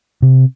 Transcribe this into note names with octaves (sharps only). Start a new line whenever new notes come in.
C3